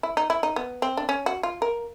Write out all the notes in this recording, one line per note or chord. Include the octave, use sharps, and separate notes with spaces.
E4
D#4
E4
D#4
B3
C4
D4
C#4
F#4
F4
A#4